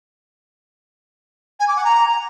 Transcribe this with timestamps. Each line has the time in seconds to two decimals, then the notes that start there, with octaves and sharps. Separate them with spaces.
1.60 G#5
1.68 D6
1.76 F#5
1.84 A#5